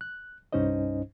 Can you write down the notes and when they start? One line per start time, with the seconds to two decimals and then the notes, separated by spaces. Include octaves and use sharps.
0.01 F#6
0.53 C2 G2 C#4 D#4 C5 D#5